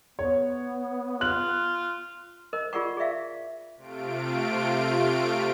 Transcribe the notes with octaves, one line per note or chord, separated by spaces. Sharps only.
B3 C#5
F4 F#6 F#7
A#4 C5 D#5
F4 G#4 A#4 D5 F#5 C#6
G#4 D5 E5 F5
C3 A3 F4 D7